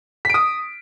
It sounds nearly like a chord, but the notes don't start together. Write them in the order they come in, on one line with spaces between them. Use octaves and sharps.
B6 D7 D#6